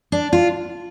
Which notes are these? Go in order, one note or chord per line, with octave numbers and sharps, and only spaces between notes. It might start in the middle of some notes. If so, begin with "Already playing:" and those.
D4
F4